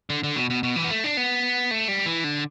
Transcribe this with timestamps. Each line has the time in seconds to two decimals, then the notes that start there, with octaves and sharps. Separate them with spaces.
0.10 D3
0.24 D3
0.36 B2
0.50 B2
0.63 B2
0.76 E3
0.84 B3
0.90 A3
1.04 D4
1.17 B3
1.71 A3
1.88 G3
2.06 E3
2.24 D3